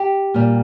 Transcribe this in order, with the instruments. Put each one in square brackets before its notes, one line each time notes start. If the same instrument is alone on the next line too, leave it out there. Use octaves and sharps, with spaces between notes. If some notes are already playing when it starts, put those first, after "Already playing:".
Already playing: [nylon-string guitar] G4
A#2 G3